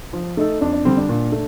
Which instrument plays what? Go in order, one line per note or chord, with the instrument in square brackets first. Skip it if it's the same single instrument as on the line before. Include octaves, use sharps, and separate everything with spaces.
[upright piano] F3
A3 D#4 A4
[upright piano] F2 [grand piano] D4
[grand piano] D4
[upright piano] D3 G3 [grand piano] C4
[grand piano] D4
[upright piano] A#2
A3